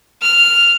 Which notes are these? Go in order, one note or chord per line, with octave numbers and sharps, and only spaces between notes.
F6